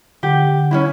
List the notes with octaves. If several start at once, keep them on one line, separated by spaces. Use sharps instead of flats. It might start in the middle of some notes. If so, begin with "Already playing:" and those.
D3 G4 F#5
C#4 D4 E4